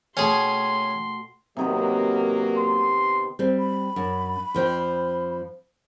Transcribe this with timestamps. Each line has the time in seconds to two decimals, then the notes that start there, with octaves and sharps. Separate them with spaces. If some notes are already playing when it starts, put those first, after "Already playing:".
0.17 B2 A3 C#4 G#4 G5 C6
1.57 C3 D#3 F#3 A#3 B3
2.57 C6
3.39 G3 C4
3.58 B5
3.96 F#2
4.54 F2 F3 G5